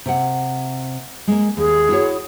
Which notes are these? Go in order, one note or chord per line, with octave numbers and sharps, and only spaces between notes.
C3 F#5
G#3 A#3
D#2 G#4
E4 F#4 C#5